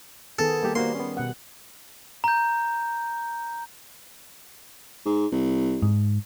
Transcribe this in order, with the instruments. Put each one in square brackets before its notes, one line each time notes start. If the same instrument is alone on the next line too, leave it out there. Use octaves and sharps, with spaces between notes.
[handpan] D#3 B3 G#4 [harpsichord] A4
[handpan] G3 [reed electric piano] A#3 G4
[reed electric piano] A#3 F#4 C5 [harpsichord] C6
[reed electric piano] B3 C#4
[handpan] B2 F#5
[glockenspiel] A#5 G6
[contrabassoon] G#2
C2
[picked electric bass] G#2